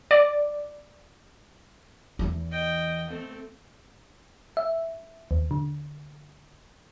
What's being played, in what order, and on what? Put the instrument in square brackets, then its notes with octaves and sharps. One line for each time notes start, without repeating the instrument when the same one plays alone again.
[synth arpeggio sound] D5
[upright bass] E2 E3
[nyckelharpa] D#5 G5
A3 C4
[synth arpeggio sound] E5
D#2
D3